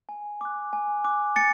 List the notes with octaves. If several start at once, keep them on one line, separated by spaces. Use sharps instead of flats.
G#5
D6 F#6
G#5
D6 F#6
G#5 A6 C#7